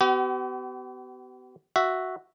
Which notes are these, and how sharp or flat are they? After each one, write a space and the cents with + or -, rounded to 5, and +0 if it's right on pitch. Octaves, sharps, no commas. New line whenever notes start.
B3 +35 G4 -45
F#4 +0 E5 +0